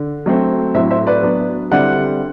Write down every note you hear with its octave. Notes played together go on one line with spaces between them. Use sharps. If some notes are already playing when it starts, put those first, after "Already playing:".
Already playing: D3
F#3 A3 C4
A2 F#3 C4 C5 E5
C5 E5
B4 D5
F#3 B3 D4
D3 G3 C4 E4 D5 F#5